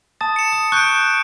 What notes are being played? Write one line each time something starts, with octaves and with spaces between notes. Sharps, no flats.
A5 D#6 A6
C#7 E7
D#6
C#6 F#6 G6 D7